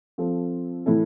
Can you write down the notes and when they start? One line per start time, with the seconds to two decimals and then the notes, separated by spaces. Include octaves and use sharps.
0.18 F3 C4 F4 A4
0.86 A2 E3 A3 E4 A4